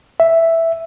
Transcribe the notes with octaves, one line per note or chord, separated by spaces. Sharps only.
E5